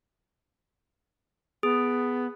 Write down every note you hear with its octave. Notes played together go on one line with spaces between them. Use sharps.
B3 G#4